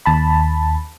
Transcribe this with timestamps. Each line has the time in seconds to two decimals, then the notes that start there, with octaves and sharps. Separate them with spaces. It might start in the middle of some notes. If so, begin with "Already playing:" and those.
0.06 D#2 A5 B5